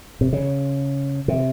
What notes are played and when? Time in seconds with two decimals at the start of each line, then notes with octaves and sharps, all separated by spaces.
0.21 C3
0.33 C#3
1.28 C3